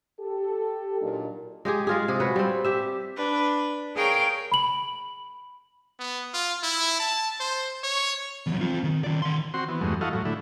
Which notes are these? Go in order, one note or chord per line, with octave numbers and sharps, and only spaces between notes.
G4 A4
A#2 F#3 A#3 D4 D#4
G#3 G4 G#4
G#3 F4 G#4
C3 G#4
F#4 B4 C#5
G3 C4
G4 E5
D4 B4
G#4 A#4 C#5 F5 G5
B5 F#7
B3
F4
E4
A5
C5
C#5
E2 F#3
C4 F4
D#3
D#3 D5
D#3 C6
C4 F#4 C6
E3 B3
E2 G2 F#3 G#3 A3
E4 F#4 A4 D#5 F5
A2 F#3
D3 A3 E4